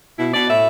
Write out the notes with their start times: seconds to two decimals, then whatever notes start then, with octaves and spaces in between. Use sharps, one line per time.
0.18 B2 E4
0.34 B2 D5
0.48 A2 E5